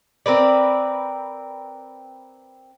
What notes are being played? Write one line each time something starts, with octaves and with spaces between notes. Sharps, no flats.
C4 A#4 B4 D5